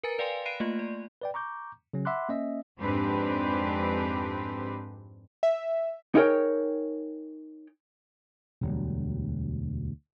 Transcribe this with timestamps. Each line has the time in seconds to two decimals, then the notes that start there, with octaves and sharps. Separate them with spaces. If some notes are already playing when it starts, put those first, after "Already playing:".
0.03 A#4 B4 G#5 A#5 A6
0.19 B4 D5 F5 G5 G#5 C6
0.45 F5 B5 F#6 C7 D7 D#7
0.60 A3 A#3 F4
0.79 D5
1.21 B4 D5 G5
1.34 A#5 C#6 D6 G6
1.93 C#3 F#3 C#4
2.05 E5 F#5 B5 C6 D6 F#6
2.29 A#3 C#4 D#5 E5
2.79 F2 G#2 C4 D4 G4 B4
5.43 E5
6.15 D#4 E4 G#4 A#4 C#5 G5
8.62 E1 D2 F#3 G3